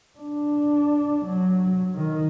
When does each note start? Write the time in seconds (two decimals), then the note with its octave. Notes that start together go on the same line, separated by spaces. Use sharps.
0.18 D4
1.25 F#3
1.95 D#3